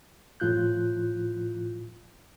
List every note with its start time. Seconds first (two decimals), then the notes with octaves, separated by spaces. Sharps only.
0.40 A2 F3 F4 F#6 G6